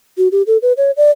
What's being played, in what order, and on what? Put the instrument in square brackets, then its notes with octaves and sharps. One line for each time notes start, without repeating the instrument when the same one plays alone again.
[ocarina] F#4
G4
A4
B4
C#5
D5